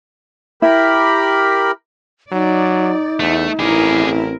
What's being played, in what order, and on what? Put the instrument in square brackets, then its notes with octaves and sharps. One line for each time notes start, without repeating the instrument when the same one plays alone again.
[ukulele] E4 [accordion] G4 A#4 B5
[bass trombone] F#3 [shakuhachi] D#4 [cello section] D5
[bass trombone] E2 [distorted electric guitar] A3
[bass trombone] A1 [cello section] C4 E4 A#4 [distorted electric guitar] G#4 D5